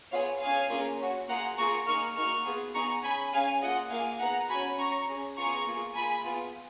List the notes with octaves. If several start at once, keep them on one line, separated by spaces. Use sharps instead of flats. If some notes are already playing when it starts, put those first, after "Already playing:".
B3 F4 G#4 C#5 F5
C#4 G#4 F5 G#5
A#3 C#4 F4 G#4
C#4 F#4
A#3 F4 G#4 F#5 A#5
A#3 F4 G#4 A#5 C#6
A#3 D#4 G#4 C#6 F6
A#3 D#4 F#4 C#6 F6
B3 F4 G#4
B3 D#4 G#4 A#5 C#6
C#4 G#4 G#5 B5
C#4 G#4 F5 G#5
A#3 F4 G#4 D#5 F#5
A#3 F4 G#4 F5 G#5
B3 D#4 G#4 F#5 A#5
C#4 F#4 G#5 B5
C#4 F#4 A#5 C#6
C#4 G#4
B3 F4 G#4 A#5 C#6
A#3 F4 G#4
A#3 F4 G#4 G#5 B5
B3 F4 G#4